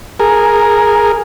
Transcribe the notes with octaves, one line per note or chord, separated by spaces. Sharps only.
G#4 A#4